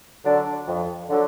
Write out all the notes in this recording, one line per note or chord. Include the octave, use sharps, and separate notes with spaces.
D3 F#3 D4
F2
D3 F#3 D4